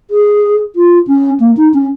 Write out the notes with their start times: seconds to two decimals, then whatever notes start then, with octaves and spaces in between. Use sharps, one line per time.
0.11 G#4
0.76 F4
1.07 C#4
1.40 A#3
1.57 D#4
1.74 C#4